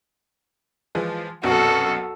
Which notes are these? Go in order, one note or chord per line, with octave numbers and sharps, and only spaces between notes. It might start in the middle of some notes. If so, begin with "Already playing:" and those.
E3 F3 G#3
C2 F#2 B2 F#4 A4